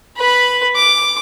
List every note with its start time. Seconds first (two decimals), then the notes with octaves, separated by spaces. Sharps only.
0.17 B4 B5
0.76 D6